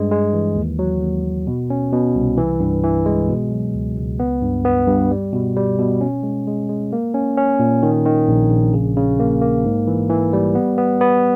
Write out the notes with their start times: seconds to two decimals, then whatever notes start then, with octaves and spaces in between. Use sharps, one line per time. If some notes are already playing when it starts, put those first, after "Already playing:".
Already playing: G2 G#3
0.11 G#3
0.33 E3
0.56 D#2
0.79 F#3
1.01 D#2
1.24 D#2
1.47 B2
1.70 C#4
1.93 B2
2.16 C2
2.37 E3
2.60 G2
2.84 E3
3.06 G#3
3.29 B2
3.52 F#3
3.74 C#2
3.97 C#2
4.19 B3
4.42 G2
4.65 B3
4.87 G2
5.11 G3
5.33 B2
5.56 G3
5.79 B2
6.01 C#4
6.23 G#3
6.47 G#3
6.69 G#3
6.93 A#3
7.14 C#4
7.37 C#4
7.59 A#2
7.83 D#3
8.06 D#3
8.28 A#1
8.50 A#1
8.74 C#3
8.96 C#3
9.20 A#3
9.42 A#3
9.65 G#2
9.87 E3
10.10 E3
10.33 G3
10.55 B3
10.78 B3
11.01 B3